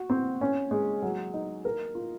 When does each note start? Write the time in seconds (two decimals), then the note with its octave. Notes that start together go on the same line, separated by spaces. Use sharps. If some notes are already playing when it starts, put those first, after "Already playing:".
Already playing: F#4
0.10 C4
0.41 C#4
0.71 G#3
1.02 F#3
1.34 D#4
1.65 A#4
1.95 F4